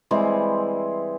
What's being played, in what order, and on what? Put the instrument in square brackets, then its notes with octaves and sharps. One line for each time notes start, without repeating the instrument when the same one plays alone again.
[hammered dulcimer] E3 G3 G#3 C4